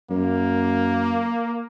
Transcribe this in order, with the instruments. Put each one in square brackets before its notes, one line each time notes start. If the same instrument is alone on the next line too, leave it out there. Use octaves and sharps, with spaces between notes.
[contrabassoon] F#2 [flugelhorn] A#3